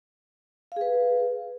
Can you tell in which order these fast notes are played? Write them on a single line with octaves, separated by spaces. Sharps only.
F5 G#4 B4